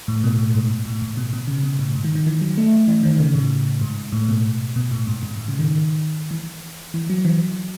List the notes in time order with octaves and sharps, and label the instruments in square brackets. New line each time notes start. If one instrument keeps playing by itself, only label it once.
[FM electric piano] A2
B2
A2
G#2
A2
A2
B2
B2
C#3
B2
A2
G#2
D#3
D#3
E3
F#3
A3
E3
D#3
C#3
A2
G#2
A2
B2
B2
A2
G#2
G#2
A2
C#3
D#3
E3
E3
F#3
E3